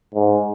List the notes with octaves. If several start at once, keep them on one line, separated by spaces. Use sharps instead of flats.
G#2